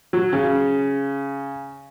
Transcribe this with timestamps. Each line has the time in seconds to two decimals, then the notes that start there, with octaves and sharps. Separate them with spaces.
0.13 F#3
0.33 C#3